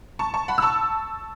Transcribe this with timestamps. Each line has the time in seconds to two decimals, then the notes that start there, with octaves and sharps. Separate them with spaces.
0.19 A5 C#6
0.34 A5 C#6
0.48 F#5 B5
0.58 E6
0.62 A5 C#6